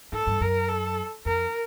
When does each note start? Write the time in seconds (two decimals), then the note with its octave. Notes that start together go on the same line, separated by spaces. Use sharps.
0.12 G#2 A4
0.27 G2
0.41 F#2 A#4
0.69 A4
1.25 F2 A#4